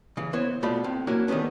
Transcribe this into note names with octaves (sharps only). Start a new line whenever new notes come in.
C#3 E3
B3 E4 C5 C#5
B2 A3 F4 D5 B5
A2 C4
F#3 A#3 C#4 D4 E4
D#3 G3 A3 B3 C#4